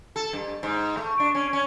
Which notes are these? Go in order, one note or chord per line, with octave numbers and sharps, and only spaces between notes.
A4
G2
G#2
A3
D4
C#4
C#4